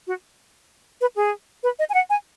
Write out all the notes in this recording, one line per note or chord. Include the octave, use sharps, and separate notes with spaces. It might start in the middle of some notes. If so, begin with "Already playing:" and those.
F#4
B4
G#4
B4
D#5
G#5
F#5
G#5